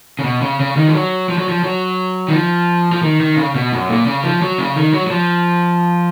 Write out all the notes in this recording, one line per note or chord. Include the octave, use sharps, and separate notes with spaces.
C#3
B2
C#3
C#3
D#3
F3
F#3
F3
F#3
F3
F#3
D#3
F3
F3
D#3
D#3
C#3
B2
F#2
A#2
C#3
F3
F#3
C#3
D#3
F#3
F#3
F3